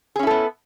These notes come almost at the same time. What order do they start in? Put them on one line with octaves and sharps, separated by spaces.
G#4 C#4 E4 A4 B3